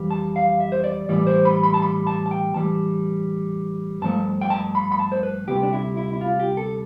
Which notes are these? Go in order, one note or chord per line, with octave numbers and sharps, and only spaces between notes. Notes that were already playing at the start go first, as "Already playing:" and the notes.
Already playing: F2 E3 G3
A5
F5
E5
C5
D5
A2 E3 G3 D5
C5
B5
B5
A5
B5
A5
A5
G5
A2 E3 G3 A5
G2 F3 A3 A5
G5
A5
B5
B5
A5
C5
B4
D2 C3 G3 G4
D4
E4
E4
E4
F4
G4
A4